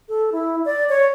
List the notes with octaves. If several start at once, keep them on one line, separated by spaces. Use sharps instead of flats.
A4
E4
D5
C#5